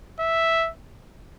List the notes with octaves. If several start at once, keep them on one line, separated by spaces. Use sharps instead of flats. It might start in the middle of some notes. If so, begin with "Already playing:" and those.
E5